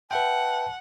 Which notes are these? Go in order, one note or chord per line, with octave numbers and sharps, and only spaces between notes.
B4 E5 F#5 G5 A5